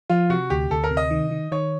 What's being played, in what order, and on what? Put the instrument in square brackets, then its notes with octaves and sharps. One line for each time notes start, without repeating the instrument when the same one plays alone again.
[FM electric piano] F3 [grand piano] F4
[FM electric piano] C3 [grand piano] F#4
[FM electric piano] D2 [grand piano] G4
[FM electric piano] D2 [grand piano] A4
[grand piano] A#4
[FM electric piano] C3
[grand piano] D#5
[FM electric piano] D#3
D#3
[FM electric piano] D#3 [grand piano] C#5